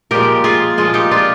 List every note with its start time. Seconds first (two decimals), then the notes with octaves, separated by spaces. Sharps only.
0.11 A#2 F3 G#3 G4 A#4
0.44 F4 G#4
0.77 A#2 F3 G#3 F4 G#4
0.94 D#4 G4
1.11 D4 F4